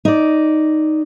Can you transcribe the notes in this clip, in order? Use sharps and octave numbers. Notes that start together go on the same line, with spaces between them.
D#4 D5